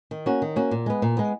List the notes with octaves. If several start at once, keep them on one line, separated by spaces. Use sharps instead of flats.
D#3
A#3 C#4 F#4
D#3
A#3 C#4 F#4
A#2
G#3 B3
A#2
G#3 B3